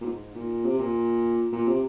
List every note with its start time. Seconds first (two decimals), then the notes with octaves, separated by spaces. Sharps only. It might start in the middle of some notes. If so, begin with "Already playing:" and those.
0.01 A#2
0.05 G#2
0.35 A#2
0.65 C3
0.79 A#2
1.52 A#2
1.68 C3